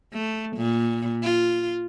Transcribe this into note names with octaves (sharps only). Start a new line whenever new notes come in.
A3
A#2
F4